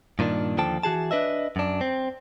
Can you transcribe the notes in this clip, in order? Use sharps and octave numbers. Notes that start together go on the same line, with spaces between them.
G2 A#2 D#3 D4
D#2 D3 F3 G5 A5
E3 F#4 G#4 A5
D4 B4 D#5 E5
F#2 D4
C4